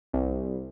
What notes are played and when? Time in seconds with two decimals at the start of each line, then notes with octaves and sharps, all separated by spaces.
0.13 C2